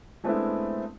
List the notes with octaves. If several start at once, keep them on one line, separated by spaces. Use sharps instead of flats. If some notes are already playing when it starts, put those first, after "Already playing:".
G#3 A3 B3 C4 D4 E4